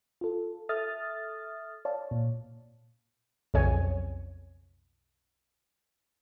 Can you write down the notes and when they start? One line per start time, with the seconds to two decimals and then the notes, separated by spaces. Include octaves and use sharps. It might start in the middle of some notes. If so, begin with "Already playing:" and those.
0.21 F4 A4
0.69 A4 E5 D#6 F6 A6
1.85 C#5 D5 F5 A5
2.11 A#2
3.54 B1 F2 C#3 C#5 G#5